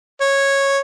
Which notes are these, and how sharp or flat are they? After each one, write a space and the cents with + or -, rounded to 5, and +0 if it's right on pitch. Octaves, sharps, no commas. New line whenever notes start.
C#5 -10